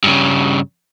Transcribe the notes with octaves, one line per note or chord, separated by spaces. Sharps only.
G2 C#3